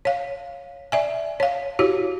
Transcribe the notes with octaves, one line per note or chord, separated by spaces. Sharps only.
C#5 F5
D5 E5 G#5
C#5 F5
E4 F#4 G4 C#5